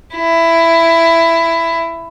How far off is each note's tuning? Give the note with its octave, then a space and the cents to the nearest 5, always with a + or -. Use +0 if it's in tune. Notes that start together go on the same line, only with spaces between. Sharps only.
E4 +10